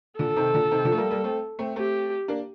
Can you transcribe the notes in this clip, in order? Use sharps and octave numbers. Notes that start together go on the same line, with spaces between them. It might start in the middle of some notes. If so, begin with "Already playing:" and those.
A#2 D3 A4
C3 D#3
A#2 D3
C3 D#3
D3 F3
A3
G3 A#3
G3 A#3
A3 C4
A3 C4
A3 C4 G4
A#3 D4